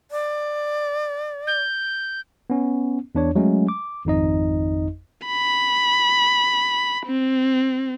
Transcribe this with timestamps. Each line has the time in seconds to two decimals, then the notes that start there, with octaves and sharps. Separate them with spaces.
0.11 D5
1.47 G6
2.50 B3 C#4
3.15 E2 D4 C#5
3.35 F#3 G#3 A3 C#4
3.69 D6
4.05 G#1 F2 D#4 D#5
5.26 B5
7.06 C4